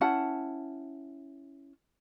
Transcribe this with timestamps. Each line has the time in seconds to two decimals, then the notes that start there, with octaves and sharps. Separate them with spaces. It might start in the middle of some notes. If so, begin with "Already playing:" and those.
0.01 C#4 E4 F#5 A5